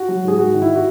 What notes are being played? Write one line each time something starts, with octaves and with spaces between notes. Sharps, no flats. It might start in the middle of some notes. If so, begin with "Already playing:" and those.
Already playing: F#4
F#3
G#2 G#4
G#2 F#4
D#3
E4
F#4